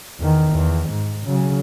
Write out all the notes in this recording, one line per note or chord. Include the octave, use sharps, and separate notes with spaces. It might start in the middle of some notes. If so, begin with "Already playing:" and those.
E2 D#3
E2
G#2
C#3 F#3